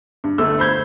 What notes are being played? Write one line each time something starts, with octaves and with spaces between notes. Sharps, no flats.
G2
G1 A3 E6
C5 B5 G6 G#6